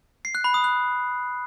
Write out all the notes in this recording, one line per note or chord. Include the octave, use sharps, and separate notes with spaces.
C7
F#6
B5
D#6
F#6